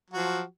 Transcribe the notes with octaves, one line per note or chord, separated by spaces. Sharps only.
F3 F#3 F#4